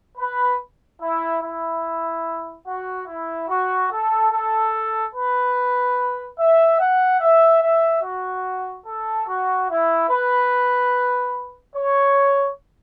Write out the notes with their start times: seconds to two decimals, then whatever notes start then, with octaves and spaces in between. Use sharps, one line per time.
0.17 B4
0.99 E4
1.41 E4
2.65 F#4
3.06 E4
3.48 F#4
3.89 A4
4.30 A4
5.13 B4
6.37 E5
6.79 F#5
7.20 E5
7.60 E5
8.02 F#4
8.85 A4
9.26 F#4
9.68 E4
10.08 B4
11.74 C#5